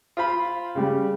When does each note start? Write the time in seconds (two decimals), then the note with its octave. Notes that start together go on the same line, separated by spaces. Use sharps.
0.17 F4 C5 B5
0.75 C#3 G3